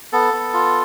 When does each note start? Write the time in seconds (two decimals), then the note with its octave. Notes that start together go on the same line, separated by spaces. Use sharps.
0.13 B3 A4
0.33 B3
0.54 F4